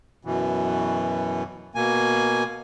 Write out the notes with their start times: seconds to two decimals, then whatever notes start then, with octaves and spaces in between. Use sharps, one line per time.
0.25 F#2 B2 E3
1.75 B2 A#3 G#5